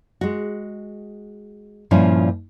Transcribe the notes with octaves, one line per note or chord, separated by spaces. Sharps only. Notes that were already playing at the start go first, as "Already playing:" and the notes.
G#3 F#4
G2 A#2 F3 C#4 E4